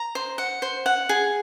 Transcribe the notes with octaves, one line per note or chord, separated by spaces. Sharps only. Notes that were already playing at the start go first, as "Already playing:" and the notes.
Already playing: A#5
C5
F#5
C5
F#5
G#4